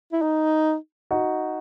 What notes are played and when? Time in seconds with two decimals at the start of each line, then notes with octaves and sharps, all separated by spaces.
0.12 E4
0.22 D#4
1.11 D#4 F#4